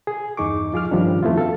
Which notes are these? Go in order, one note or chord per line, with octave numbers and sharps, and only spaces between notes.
G#4
E2 G2 D#4 G#4 C#6 D6
F3 F4 G#4 D6 F6
G2 D#3 F3 G3 C#4 D4
F2 A3 B3 C4 E4 F4
F#4 A4 F5